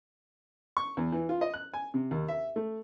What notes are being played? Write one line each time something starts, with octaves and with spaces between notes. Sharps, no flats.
C#6
E2
E3
F4
D#5
F#6
G#5
C3
D#2
E5
A3